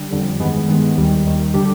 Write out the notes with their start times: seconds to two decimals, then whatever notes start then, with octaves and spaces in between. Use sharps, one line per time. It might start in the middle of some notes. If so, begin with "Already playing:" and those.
Already playing: D3 G3
0.11 F2 D3 G3
0.40 G2 D#3 G#3 B3
0.68 G2 D#3 G#3 B3
0.97 D#2 D#3 G3
1.25 D#2 D#3 G3
1.54 D3 G3 D4 G4